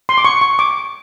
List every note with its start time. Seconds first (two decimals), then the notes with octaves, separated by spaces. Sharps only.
0.09 C6
0.18 D6
0.25 C#6
0.41 C#6
0.59 D6